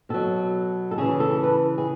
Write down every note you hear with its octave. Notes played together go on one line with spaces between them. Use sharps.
B2 F#3 A4
A4
C#3 E3 G#4
A4
B4
G#4